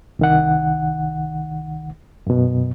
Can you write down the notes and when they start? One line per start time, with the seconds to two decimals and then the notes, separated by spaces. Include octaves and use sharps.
0.19 C2 D#3 F#5
2.27 F#2 B2